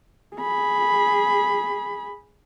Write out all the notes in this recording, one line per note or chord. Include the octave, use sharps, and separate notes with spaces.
G#4 B5